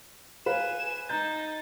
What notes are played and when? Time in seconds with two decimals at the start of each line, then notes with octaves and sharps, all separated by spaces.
0.46 B4 F5 G#5 E7
1.09 D#4 A#5 G6 A6